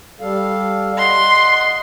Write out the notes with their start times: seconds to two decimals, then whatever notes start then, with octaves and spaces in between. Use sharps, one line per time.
0.21 G3 A4 F5
0.98 D#5 F#5 C6